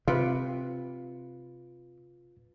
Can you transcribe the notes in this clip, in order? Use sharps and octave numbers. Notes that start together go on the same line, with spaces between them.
C3 F4 B4